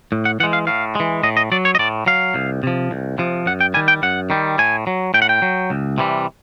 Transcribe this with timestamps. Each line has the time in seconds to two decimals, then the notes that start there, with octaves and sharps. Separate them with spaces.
0.12 A2
0.25 F#5
0.40 E3 F#5
0.43 G#3
0.53 F5
0.67 A2 F5
0.95 E3 G#3
1.23 A2 D#5
1.37 D#5
1.52 F#3 D5
1.65 C#5
1.75 D#5
1.79 A2 D5
2.06 F#3 F5
2.34 C2
2.63 C3 F3
2.91 C2
3.18 C3 F3
3.46 F#2 F#5
3.61 G5
3.74 D#3 G3 G#5
3.88 G5
4.03 F#2 F#5
4.30 D#3 G3
4.58 A2 G#5
4.87 F#3
5.14 A2 G5
5.22 F#5
5.29 G5
5.42 F#3
5.70 C#2
5.98 C3 E3 G3